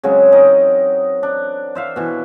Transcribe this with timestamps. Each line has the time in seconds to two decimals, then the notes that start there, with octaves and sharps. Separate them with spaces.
0.03 C#3 F#3 G#3 C4
0.32 D#4 A#4 D#5
1.23 D4
1.75 C5 E5 F5
1.96 B2 E3